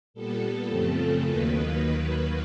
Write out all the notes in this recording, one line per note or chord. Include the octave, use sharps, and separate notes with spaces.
A#2 G3 B3 A4
F#2 C#3 F3 A3 C4
D#2 D#3 F#3 A#3 B4